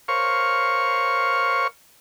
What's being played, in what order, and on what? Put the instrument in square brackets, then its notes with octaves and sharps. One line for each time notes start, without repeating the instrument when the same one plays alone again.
[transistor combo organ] A#4 C5 C#5 F5 C#6